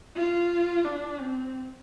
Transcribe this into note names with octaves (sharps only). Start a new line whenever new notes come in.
F4
D4
C4